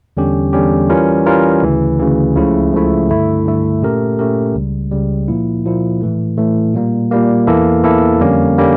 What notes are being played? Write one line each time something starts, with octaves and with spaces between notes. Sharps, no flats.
E2 D3 G3 C#4 G4
E2 D3 G3 C#4 G4
E3 G3 C#4 F4 A#4
E3 G3 C#4 F4 A#4
D2 C#3 E3
D2 C#3 E3
C#2 C#3 F3 A3 E4
C#2 C#3 F3 A3 E4
G2 D3 A3 E4
G2 D3 A3 E4
A#2 A3 C#4 G4 A#4
A#2 A3 C#4 G4 A#4
C#2 C#3 G3
C#2 C#3 G3
A#2 F3 A#3 E4
A#2 F3 A#3 E4
A2 E3 A3
A2 E3 A3
A#2 G3 A#3
A#2 G3 A#3
E2 E3 A#3 E4 A4
E2 E3 A#3 E4 A4
F2 D3 G3 A#3 C#4
D3 G3 A#3 C#4